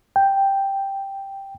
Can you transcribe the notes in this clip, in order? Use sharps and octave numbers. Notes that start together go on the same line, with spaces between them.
G5